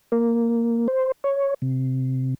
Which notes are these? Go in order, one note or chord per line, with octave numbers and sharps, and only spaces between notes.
A#3
C5
C#5
C3